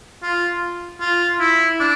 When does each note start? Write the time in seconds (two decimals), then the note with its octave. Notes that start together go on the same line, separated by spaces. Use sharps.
0.23 F4
1.01 F4
1.40 E4
1.80 D4